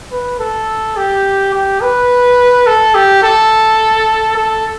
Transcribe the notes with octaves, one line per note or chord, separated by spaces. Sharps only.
B4
A4
G4
G4
B4
A4
G4
A4
A4